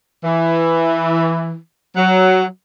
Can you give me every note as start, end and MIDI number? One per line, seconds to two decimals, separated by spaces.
0.24 1.57 52
1.97 2.44 54